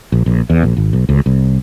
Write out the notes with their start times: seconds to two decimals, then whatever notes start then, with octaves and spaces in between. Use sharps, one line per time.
0.12 A#1
0.26 A#1
0.50 E2
0.63 A#1
0.77 G#1
0.93 B1
1.09 C#2
1.26 C2